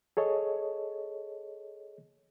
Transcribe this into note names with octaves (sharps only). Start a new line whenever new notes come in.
G#4 A4 C#5 D#5